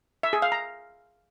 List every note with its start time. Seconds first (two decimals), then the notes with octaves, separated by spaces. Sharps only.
0.23 E5
0.33 G#4
0.42 F5
0.52 A#5